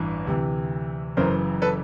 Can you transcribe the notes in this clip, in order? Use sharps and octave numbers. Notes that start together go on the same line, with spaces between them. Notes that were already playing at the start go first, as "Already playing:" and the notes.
Already playing: A1 G2 E3
D2 C3 E3
F#1 F#2 C#3 E3 A#4 C5
A4 B4